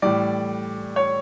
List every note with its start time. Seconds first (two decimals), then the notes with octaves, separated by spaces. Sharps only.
0.02 A2 E3 G3 D5
0.96 C#5